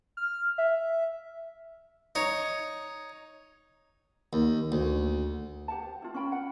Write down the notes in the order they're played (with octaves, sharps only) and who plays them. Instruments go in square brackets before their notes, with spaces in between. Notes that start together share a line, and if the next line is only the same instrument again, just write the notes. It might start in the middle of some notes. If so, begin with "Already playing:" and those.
[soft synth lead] F6
E5
[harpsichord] D#4 C#5
D#2
D2
[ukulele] G4 F#5 A5
C5
E4 F4
C#4 F4 G5 B5
F#5